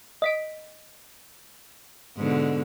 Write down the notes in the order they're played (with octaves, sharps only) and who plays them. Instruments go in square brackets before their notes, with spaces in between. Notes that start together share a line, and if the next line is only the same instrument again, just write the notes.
[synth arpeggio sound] D#5 B6 D7
[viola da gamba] G#2 B2 D3